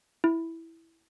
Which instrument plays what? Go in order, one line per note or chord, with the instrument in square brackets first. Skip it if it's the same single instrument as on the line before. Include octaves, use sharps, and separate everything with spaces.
[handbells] E4